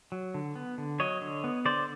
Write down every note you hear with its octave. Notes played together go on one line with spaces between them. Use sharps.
F#3
D3
B3
D3
F#3 C#5 D#5
D3
B3
D3 C5 D5